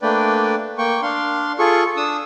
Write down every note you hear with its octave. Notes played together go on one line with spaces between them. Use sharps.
A3 A#3 D4 B4 D5 G5
A#3 G5 C#6
D4 F5 C6
F4 G#4 A4 C#6
D4 D#6 E6